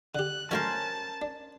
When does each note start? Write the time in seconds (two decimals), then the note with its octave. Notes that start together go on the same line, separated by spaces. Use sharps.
0.15 D3 G4 F#6
0.51 D#3 F#3 A3 C#4 A#4 C5 A5
1.22 D4